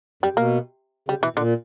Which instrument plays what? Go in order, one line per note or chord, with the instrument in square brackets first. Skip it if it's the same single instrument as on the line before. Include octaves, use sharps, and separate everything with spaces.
[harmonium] F#2 [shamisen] G3
[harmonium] B2 [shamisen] A#3
[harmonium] C#3 [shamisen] G3
[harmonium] B2 [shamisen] E3
[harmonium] A#2 [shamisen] D3